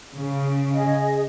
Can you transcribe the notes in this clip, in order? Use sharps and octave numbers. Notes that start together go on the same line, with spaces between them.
C#3
G#4 D#5